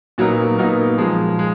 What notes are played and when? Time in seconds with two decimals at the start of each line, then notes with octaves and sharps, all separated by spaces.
0.18 A#2 F#3 B3 D#4 A#4
0.58 A#2 F#3 B3 D#4 A#4
0.98 A#2 F3 G#3
1.39 G#3